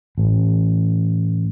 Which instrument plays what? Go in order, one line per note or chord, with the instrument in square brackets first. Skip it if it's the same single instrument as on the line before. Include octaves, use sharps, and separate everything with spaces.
[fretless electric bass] A1